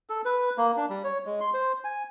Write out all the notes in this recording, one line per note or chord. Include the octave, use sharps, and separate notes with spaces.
A4
B4
A#3
D4
G3
C#5
G#3
C6
C5
G#5